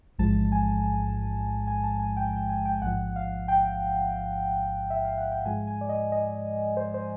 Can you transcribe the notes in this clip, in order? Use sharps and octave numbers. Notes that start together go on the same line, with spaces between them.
A1 G#2 F3 G#3 A5
G#5
G#5
A5
G#5
G5
G5
G#5
G5
A1 G#2 F3 F#5
F5
G5
E5
F5
F#5
G5
G#2 F3 G#3 G#5
G#5
D5
D#5
D#5
C5
C5